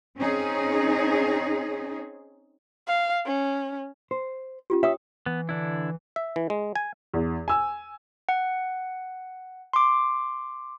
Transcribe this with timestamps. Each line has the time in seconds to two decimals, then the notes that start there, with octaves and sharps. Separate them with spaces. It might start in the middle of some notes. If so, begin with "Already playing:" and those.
0.17 C4 C#4 D#4 G#4
2.87 F5
3.26 C#4
4.11 C5
4.70 C#4 F4 G4
4.83 C#5 E5 G5 D#6
5.26 E3 B3
5.49 D3 D4 E4
6.16 E5
6.36 E3
6.50 G#3
6.75 G#5
7.14 E2
7.48 G#5 E6
8.29 F#5
9.73 C6 D6